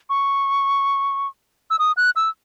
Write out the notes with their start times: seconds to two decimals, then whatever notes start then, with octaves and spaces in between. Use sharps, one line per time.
0.10 C#6
1.70 E6
1.79 D#6
1.97 F#6
2.16 E6